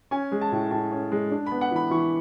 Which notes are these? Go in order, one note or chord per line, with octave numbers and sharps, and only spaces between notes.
C#4 G#5
G#3
A5
A2
A2 A5
C#4
G#3
D4
B3 B5
F#5
E3 B5
E3 C#6